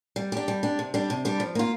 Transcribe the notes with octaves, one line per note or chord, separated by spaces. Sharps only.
G3
D4 G4
G3
D4 G4
C3
G3 D4 G4
C3
G3 D4 G4
F3
A#3 F4